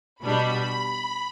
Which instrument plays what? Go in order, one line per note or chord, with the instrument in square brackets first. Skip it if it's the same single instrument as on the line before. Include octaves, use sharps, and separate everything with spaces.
[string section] B2 G3 D4 B5